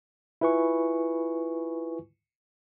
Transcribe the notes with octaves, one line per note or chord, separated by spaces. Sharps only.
E4 F4 B4 G#5 C#6